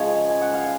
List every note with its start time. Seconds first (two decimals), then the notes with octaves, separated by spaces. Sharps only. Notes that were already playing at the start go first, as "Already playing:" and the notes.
Already playing: C#3 F3 G#3 C#5
0.30 G#5
0.42 F#5
0.54 F5